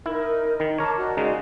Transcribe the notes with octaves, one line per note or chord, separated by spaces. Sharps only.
D#4 E4 A#4
D#3
A#4 C#5 A5 A#5 D6
F#4 D5 D#5
C#3 G#3 D#4